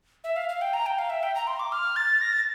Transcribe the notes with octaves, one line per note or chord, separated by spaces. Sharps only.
E5
F5
F5
G5
A#5
G5
F5
E5
G5
A#5
C6
D6
F6
A6
A#6
A6